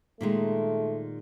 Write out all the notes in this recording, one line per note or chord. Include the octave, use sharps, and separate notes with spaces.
A#2 D#3 G#3 A3